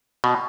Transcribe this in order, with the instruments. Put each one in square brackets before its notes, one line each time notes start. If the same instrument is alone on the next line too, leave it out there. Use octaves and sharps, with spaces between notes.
[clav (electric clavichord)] B2